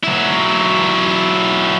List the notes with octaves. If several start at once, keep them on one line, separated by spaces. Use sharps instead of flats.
F#3 E4